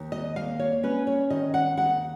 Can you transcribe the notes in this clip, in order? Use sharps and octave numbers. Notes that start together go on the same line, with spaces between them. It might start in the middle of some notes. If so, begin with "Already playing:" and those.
Already playing: D#2
D#5
A#3 F5
C#5
C#4 B4
C#5
D#3 D#5
F#5
D#2 F#5